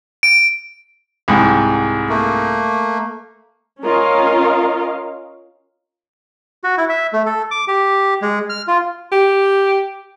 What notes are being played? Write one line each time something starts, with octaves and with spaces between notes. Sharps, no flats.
D7
C2 G#2
A3 A#3
C#4 F4 A#4 D#5 F5
F#4
E4
E5
A3
A4
D6
G4
G#3
F6
F4
G4